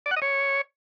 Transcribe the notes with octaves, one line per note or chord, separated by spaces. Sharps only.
D5
F#5
D#5
C#5